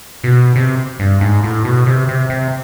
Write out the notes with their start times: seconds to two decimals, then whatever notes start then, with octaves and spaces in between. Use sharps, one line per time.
0.24 B2
0.56 C3
1.00 G2
1.21 G#2
1.44 A2
1.65 B2
1.86 C3
2.08 C3
2.30 C3